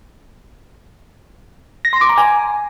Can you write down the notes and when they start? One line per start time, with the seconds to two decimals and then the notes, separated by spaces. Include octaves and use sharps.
1.85 A#6
1.93 C6
2.01 D6
2.09 A#5
2.18 G#5